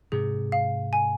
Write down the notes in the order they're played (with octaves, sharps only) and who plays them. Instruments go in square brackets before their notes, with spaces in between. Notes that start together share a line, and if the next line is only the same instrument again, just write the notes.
[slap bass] G#2 C3 [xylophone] G#4
[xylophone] F5
G#5